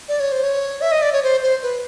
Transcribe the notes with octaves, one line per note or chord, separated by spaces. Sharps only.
D5
C#5
C5
C#5
E5
D#5
D5
C#5
C5
C5
B4